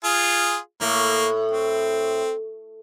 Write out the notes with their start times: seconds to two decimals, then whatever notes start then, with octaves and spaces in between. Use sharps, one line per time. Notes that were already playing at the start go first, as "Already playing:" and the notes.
0.04 F4 G#4
0.81 A2 A#3
1.51 C4